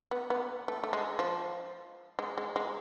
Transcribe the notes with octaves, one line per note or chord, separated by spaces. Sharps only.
B3
B3
A3
A3
G#3
F3
G#3
G#3
G#3